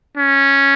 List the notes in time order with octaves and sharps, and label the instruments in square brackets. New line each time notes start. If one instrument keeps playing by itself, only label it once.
[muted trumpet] C#4